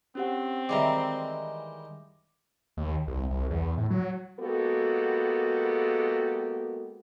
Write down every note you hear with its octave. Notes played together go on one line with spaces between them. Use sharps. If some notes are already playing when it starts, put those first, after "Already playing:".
C4 C#4 G4 F#5
D#3 E3 G3 G#3 F5 A#5 D6 A#6
D#2
C2
C2
E2
A2
F#3
G#3 A#3 B3 F#4 G4 A4